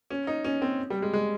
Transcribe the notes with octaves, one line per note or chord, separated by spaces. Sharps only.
C#4
D#4
C#4
C4
G3
G#3
G#3